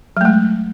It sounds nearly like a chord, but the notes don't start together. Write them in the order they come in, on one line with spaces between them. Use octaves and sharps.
F#3 A3 G#3